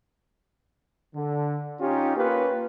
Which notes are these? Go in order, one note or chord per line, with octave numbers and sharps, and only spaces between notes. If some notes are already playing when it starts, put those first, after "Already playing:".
D3
C#4 D#4 F4 G4
A#3 C#4 F4 G4 B4